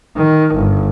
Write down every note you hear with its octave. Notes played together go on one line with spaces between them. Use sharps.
D#3
G1